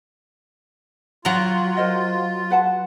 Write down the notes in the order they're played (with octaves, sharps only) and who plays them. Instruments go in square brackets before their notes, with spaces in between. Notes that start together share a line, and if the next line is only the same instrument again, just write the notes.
[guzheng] F#3 A#5 [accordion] F4
[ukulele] A#4 C5 D#5
B4 F#5 A5